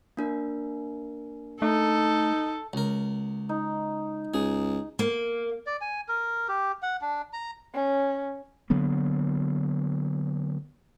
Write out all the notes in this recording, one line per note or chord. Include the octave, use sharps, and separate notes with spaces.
A#3 D4 A#4
A3 D#4 A4
C#2 A#4
D#4
C#2 G#4
A#3
D5
G#5
A#4
G4
F#5
D4
A#5
C#4
D3 F#3 A#3 B3